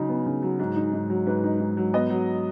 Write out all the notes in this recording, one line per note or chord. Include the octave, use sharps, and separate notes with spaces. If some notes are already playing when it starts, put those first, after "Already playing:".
Already playing: C#3 F#3 D#4
B3
C#3
F#3
G#2
D#4
G#2
F#3
G#2 B4
D#4
G#2
F#3
B3 D#5
F#3